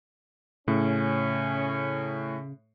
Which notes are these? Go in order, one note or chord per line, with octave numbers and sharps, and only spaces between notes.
A2 C#3 C#4